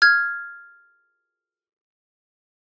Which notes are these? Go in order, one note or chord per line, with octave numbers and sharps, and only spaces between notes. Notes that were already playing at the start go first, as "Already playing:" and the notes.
F6 G#6